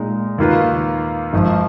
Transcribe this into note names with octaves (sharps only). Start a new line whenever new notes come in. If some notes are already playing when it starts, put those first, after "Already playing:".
Already playing: A#2 G#3 D#4
D#2 D#3 A#3 F4 B4
G#1 G#2 F3